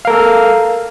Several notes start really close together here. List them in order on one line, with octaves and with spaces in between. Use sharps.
F5 A#4 A4